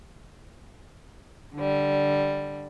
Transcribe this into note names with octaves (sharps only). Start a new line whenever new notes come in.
D3 G3